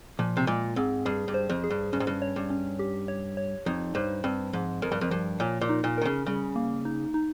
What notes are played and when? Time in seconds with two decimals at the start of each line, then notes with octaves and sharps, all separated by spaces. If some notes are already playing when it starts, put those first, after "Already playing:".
0.19 A#2 F3
0.37 C3
0.47 A#2 G#3
0.76 G#2 C4
1.05 G2 G#4
1.28 G2
1.34 C5
1.49 F2
1.64 G#4
1.70 G2
1.93 G2 C#4
2.00 G#2
2.07 G2
2.22 C#5
2.36 G2
2.50 C#4
2.79 G4
3.08 C#5
3.37 C#5
3.66 F2 D#4
3.95 G2 C5
4.24 G2 C4
4.53 G#2 F3
4.82 F2 A#4
4.92 G2
5.01 F2
5.11 G2 F3
5.40 A#2 C#5
5.61 A#2
5.69 D#4
5.84 A#2
5.98 D#3 A#4
6.05 C#3
6.26 C#3 G3
6.56 A#3
6.85 D#4
7.14 D#4